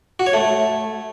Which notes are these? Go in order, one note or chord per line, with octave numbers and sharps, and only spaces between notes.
F#4
C#5
A3